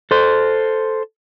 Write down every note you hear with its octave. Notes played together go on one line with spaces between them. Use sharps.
A4 C5